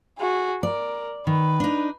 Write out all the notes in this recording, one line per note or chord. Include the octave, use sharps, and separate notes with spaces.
F#4 G#4
A#4 D5
D#3 B4
D4 D#4